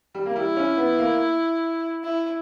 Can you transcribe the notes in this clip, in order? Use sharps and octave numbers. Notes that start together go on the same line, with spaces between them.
G3
A#3
G3 E4
C#4
B3
A#3
E4